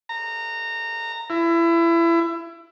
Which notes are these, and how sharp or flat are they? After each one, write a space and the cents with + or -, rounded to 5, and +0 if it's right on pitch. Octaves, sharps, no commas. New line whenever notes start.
A#5 -20
E4 +25